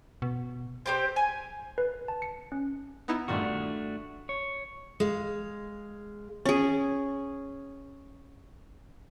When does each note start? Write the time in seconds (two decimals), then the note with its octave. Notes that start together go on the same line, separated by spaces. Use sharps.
0.22 B2
0.86 C4 G4 C5
1.16 G#5
1.78 B4
2.08 A5
2.22 C#7
2.52 C#4
3.08 B3 D#4 E4
3.28 G2 A#2 D#3 A3 D4 F#4
4.29 C#5
5.00 G#3 F5
6.45 C#4 G#4